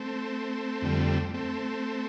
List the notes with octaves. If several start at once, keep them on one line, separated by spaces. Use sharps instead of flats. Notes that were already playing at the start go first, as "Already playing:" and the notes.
Already playing: A3 C4
F2 D3 G3
A3 C4